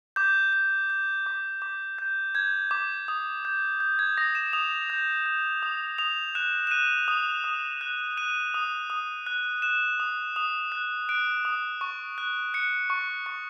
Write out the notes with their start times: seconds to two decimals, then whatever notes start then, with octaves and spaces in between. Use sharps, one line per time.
0.16 D6 G6
0.53 G6
0.90 G6
1.26 D6
1.62 D6
1.99 G6
2.35 G6 G#6
2.71 D6
3.08 D#6
3.45 G6
3.80 G6
3.99 G#6
4.17 D#6 A#6
4.35 E7
4.53 D#6 F7
4.90 G6
5.26 G6
5.63 D#6
5.98 D#6 F7
6.35 F#6 E7
6.67 E7
6.71 F#6 D#7
7.08 D#6
7.44 D#6
7.81 F#6
8.17 F#6 D#7
8.54 D#6
8.90 D#6
9.26 F#6
9.62 F#6 E7
10.00 D#6
10.36 D#6
10.72 F#6
11.09 F#6 D7
11.45 D#6
11.81 C#6
12.18 F#6
12.54 F#6 C#7
12.90 C#6
13.26 C#6